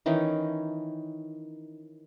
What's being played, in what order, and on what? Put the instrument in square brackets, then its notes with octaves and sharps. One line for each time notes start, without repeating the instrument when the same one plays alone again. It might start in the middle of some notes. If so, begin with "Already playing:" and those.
[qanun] D#3 E3 C#4 D#4